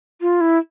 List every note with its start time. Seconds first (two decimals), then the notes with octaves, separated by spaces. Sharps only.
0.21 F4
0.41 E4